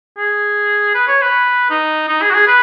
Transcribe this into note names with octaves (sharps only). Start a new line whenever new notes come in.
G#4
B4
C#5
B4
D#4
D#4
G#4
F#4
G#4
B4